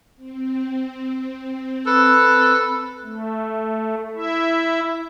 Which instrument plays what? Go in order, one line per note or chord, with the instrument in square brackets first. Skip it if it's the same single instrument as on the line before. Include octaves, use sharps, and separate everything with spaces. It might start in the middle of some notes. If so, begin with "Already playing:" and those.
[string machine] C4
[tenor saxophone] A4 [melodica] B4
[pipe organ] A3
E4 E5